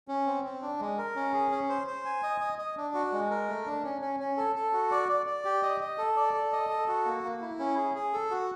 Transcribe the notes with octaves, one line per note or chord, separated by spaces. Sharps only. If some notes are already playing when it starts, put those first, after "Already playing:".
C#4
C4
C4
D4
G#3
A#4
C#4
G#4
C#4
C5
C5
G#5
D#5
D#5
D#5
D4
F#4
G#3
A#4
A3
D4
C#4
C#4
C#4
A4
A4
F#4
D5
D5
D5
G4
D#5
D#5
A4
D5
A4
D#5
A4
F#4
A#3
A#3
E4
C#4
G#4
G#4
A4
F#4